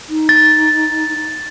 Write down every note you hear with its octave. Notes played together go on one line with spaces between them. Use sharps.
D#4
A6